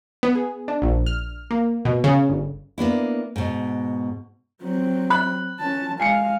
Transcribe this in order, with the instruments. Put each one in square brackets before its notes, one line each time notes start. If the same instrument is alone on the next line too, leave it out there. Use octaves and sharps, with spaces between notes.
[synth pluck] B3
G#4
D4
A#1
F6
A#3
B2
C#3
G1
[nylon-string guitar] A#3 B3 D4 E4
G#2 B2
[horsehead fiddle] F#3 C4
[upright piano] B5 F#6
[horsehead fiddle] C#4 A5
[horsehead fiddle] G#3 F5 [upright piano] G#5 C7 C#7